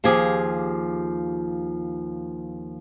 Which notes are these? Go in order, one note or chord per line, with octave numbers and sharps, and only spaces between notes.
D#2 F3 G4 G#4